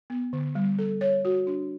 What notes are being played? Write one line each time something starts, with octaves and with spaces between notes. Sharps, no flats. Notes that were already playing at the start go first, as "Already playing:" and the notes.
B3
D3
G3
A4
C#5
F#4
D4